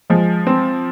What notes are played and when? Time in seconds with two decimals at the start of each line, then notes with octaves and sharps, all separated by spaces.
0.10 F3 G#3
0.47 C4